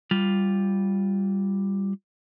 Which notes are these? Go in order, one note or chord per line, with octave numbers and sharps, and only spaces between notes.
G3 F4